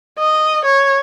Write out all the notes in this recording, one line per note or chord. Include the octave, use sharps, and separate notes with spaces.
D#5
C#5